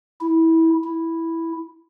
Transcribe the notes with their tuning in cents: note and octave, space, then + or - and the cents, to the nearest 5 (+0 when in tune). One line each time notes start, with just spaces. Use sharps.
E4 -20
E4 -5